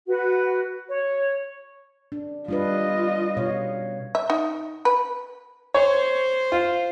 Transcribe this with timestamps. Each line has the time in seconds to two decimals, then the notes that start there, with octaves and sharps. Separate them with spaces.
0.07 F#4 B4
0.88 C#5
2.12 D4
2.48 G3 D4 F4 B4 D#5
3.37 B2 C#5 F5
4.15 E5
4.30 D#4
4.85 B4
5.74 C5 C#5
6.52 F4